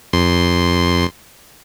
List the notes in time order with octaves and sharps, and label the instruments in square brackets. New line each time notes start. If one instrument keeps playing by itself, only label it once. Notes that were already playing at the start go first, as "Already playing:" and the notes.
[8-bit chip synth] F2 C6